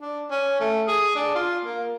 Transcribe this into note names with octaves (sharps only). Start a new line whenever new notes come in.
D4
C#4
A3
G#4
D4
F4
A#3